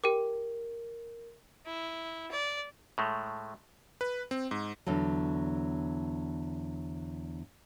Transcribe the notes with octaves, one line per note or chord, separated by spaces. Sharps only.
G4 A#4 G5 D6
E4
D5
A2 G#3 A3
B4
C4
G#2
E2 D3 F#3